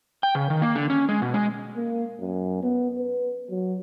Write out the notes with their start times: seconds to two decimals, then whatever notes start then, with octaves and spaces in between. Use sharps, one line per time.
0.23 G5
0.35 C#3
0.50 D#3
0.62 A#3
0.75 D3
0.90 C#4
1.09 G#3
1.22 B2
1.34 G#3
1.76 A#3
2.20 F#2
2.63 B3
2.98 B4
3.50 F#3